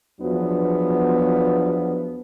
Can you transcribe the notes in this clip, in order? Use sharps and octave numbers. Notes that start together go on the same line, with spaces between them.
E2 F3 F#3 B3 D4